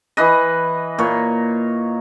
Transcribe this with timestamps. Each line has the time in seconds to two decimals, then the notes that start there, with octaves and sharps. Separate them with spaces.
0.17 E3 B4 D#5
0.98 A#2 C#5